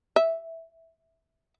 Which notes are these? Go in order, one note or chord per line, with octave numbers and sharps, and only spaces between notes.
E5